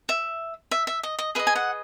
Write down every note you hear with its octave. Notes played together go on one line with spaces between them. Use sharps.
E5
E5
E5
D#5
D#5
G#4 B4 D#5 E5
G#5
F#5